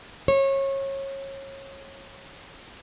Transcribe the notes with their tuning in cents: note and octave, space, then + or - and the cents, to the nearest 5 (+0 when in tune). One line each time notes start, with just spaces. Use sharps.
C#5 -25